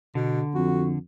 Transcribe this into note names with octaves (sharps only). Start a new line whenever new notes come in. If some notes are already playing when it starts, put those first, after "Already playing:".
B2 D3
F2 F#4